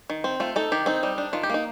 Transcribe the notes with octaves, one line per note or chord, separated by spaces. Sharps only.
D#3
C4
A3 F4
D#4 A4
D#3 G4
C4 D#4
G3
D4
D#3 F4
G4
A#3 D#4